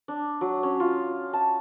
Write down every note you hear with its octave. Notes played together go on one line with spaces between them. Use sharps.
D4
F#3
C#4
F4
A5